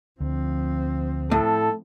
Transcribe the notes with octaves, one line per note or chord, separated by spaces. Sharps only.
D2 F3 C4
A2 A4